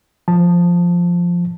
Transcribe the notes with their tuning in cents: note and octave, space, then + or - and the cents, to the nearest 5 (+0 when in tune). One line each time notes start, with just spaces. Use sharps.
F3 +0 A5 +0